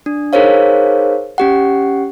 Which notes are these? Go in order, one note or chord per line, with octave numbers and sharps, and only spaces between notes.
D4
D#4 G#4 A#4 C5 C#5 F5
C#4 G4 F#5